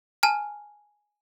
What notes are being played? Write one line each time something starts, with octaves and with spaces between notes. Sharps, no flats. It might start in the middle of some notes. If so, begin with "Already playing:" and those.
G#5 A5 F6